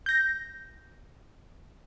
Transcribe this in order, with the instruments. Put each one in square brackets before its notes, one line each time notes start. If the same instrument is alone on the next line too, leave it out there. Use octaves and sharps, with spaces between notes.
[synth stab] G6 A#6